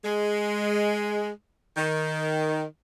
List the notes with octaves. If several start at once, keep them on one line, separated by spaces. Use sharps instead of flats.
G#3
D#3